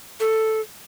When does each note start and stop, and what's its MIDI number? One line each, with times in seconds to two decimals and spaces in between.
0.20 0.61 69